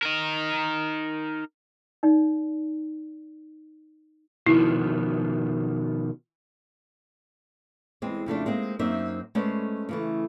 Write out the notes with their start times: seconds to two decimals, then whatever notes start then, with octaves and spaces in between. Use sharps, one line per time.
0.03 D#4 A#4
2.03 D#4 D5
4.46 B2 D#3 F3 E4
8.02 E2 G#3 C4
8.26 F2 C#3 A3 D4
8.46 G#3 A#3 C4 D#4
8.79 F#2 A#3 C4 D#4 E5
9.35 G#3 A3 C#4 B4 C5 D5
9.89 C#3 E3 A3